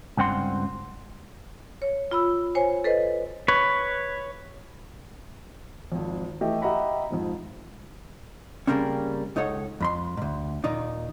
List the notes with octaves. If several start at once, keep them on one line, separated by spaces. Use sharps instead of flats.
C#2 G2 C4 F#5 C6
C#5
F4 B5 E6
C5 C#5 G#5
A4 B4 C5 D#5
B4 C#5
G#1 F2
E3 A3 G4 D#5 E5
G4 D#5 E5 F#5 A#5 B5
F2 G#2 F3
C#3 F3 G3 A#3 C4 C#4
C#2 D#4 A4 C#5 F#5
F2 B5 C6
D2 G#2
D#2 A#2 D#3 D#4 D5